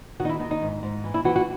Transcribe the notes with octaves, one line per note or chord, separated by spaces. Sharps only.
D#3 F#4
D#4
E4
D#3 D#4
D#4
G#2
G#2
E3
E4
E3 F#4
F#4